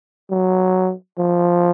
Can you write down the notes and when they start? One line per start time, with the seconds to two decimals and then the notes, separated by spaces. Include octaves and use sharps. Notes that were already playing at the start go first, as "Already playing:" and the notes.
0.31 F#3
1.18 F3